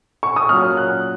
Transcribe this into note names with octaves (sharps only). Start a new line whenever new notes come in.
C#6
D#6
A#2 F#3 C#4 F6
F#6